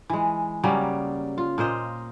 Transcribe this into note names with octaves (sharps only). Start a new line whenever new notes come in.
E3 G#3
C#3 F#3 G3 A#3
F4
A#2 A#4 C5 D#5